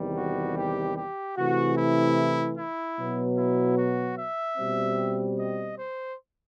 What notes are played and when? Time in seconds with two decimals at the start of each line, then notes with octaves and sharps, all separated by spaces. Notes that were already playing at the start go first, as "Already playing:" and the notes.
Already playing: E2 C3 D#3 G3
0.18 F#4
0.58 G4
0.97 G4
1.37 C3 E3 A3 F#4
1.78 E4
2.57 E4
2.98 B2 F#3 B3
3.38 E4
3.78 F#4
4.19 E5
4.58 B2 G3 C4
5.39 D#5
5.78 C5